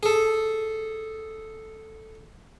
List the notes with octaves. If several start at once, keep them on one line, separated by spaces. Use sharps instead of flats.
G#4 A4